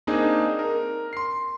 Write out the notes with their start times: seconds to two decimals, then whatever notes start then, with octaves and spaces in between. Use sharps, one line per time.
0.07 A#3 C4 D4 D#4 G#4
0.59 A#4
1.13 C6 C7